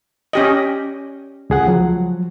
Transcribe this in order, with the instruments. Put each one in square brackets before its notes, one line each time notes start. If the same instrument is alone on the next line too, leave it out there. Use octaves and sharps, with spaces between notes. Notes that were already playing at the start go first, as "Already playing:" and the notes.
[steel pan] C#4 G4 D#5
[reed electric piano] C#2 G#4 F#5
F3 F#3